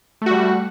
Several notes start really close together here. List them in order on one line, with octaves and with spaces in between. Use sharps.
A3 F#4 G3